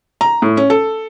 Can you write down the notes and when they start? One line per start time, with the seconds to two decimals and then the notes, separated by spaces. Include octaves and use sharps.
0.21 A#5
0.42 A2
0.57 C#4
0.70 A4